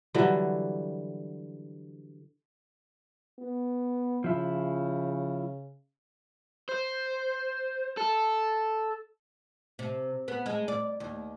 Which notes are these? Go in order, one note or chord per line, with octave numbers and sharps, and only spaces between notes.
D3 E3 F#3 G3
B3
C#3 F3 E4
C5
A4
C3
B3
G#3
D5
D#2